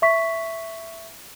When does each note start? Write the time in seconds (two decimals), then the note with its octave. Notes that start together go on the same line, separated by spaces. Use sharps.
0.02 E5 C#6 B6